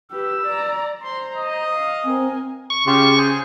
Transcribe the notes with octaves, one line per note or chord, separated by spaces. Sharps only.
G4 B4 E6
D5 A#5
C5 A#5 C6
D#5
F5
C4 A#4 G#5
C#6
C#3 F4 G4 C6
G#4 C5 G#5